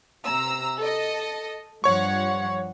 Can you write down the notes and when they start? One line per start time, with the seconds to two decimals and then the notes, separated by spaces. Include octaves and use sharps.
0.24 C3 A#5 E6
0.78 A4 D#5
1.84 G2 F3 C#5 F#5 C#6